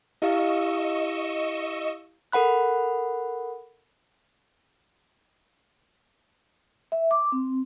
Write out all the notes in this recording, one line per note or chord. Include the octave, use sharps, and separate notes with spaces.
E4 G4 D#5 F5 C#6 E6
A4 A#4 F#5 B5 F#6
E5
D6
C4